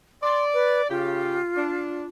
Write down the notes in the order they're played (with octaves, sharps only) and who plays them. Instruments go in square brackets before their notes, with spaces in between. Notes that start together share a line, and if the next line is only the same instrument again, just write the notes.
[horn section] D5 [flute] C6
[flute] B4
[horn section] C#3 G4 [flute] F4
[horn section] D4